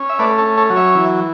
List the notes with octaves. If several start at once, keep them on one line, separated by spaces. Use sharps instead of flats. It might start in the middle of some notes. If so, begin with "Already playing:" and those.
Already playing: C#4
E5
A3 B4 D5
A4 C#5
C#4
A4 C#5
F#3
C#5 E5
E3